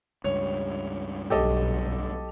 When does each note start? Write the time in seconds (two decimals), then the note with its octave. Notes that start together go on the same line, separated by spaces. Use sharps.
0.24 C#2 G2 C#5
1.30 B1 G4 A4 D#5